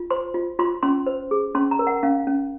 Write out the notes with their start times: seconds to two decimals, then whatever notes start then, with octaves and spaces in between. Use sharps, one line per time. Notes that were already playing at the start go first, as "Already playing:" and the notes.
Already playing: F4
0.10 C5 C6
0.34 F4
0.59 F4 C6
0.83 C#4 C6
1.07 C5
1.31 G#4
1.55 C#4 C6
1.71 A#5
1.79 A#4
1.87 F#5
2.03 C#4 F5
2.27 C#4